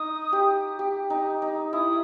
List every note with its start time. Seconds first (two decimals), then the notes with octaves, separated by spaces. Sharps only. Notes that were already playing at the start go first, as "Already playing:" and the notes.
Already playing: D#4 D#6
0.33 G4
0.79 G4
1.10 D#4
1.42 D#4
1.73 E4 D#6